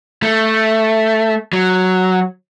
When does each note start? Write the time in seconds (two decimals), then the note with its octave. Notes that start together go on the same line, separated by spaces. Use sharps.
0.23 A3
1.53 F#3